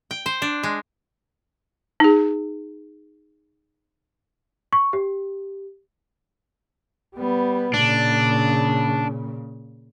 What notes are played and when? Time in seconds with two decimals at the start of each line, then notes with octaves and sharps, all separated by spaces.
0.11 G5
0.26 C5
0.42 D4
0.63 G#3
2.00 D#4 G#4
4.73 C#6
4.93 G4
7.16 G3 B3
7.74 A#2 C#3 D4